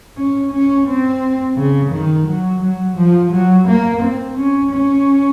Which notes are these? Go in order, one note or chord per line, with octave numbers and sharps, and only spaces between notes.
C#4
C#4
C4
C#3
D#3
F#3
F#3
F3
F#3
A#3
C4
C#4
C#4